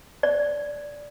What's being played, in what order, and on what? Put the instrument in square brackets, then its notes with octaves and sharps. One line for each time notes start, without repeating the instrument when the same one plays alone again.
[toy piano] D5